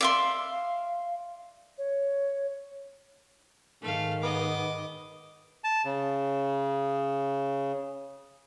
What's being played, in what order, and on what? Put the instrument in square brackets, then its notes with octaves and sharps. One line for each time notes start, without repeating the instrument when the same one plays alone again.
[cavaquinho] D5 E5 C6 [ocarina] F5
[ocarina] C#5
[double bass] G#2 D#3 [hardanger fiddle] A3 F5
[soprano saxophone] B3 [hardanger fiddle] D#5 D6
[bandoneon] A5
C#3